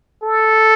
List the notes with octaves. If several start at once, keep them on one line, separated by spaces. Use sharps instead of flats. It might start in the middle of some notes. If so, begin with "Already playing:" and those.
A4